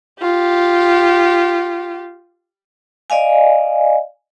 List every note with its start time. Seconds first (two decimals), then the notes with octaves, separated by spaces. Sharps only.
0.21 F4 G4
3.10 D5 D#5 F5 G#5